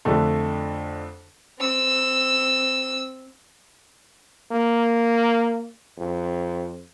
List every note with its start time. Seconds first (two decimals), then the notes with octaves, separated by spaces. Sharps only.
0.05 F2 D3 A3 D4
1.59 C4 E6
4.51 A#3
5.98 F2